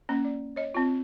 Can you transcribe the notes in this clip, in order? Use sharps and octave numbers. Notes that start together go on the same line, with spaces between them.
A#3 C#4
D5
C#5 D#5
C4 F4